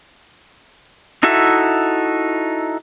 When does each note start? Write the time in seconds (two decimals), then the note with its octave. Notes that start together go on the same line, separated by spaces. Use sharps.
1.23 D#4 E4 F#4 A4 E5